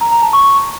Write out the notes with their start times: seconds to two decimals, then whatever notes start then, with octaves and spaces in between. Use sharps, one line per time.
0.01 A#5
0.12 A#5
0.22 A5
0.33 C#6